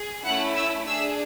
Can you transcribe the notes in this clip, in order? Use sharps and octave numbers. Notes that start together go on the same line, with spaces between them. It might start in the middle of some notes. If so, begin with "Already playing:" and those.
Already playing: G#4
A3 C#4 E4 F#5 F#6
E5 E6
D4 G#4 E5 E6